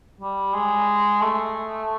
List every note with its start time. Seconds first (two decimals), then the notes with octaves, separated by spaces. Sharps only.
0.21 G3
0.54 G#3
1.21 A3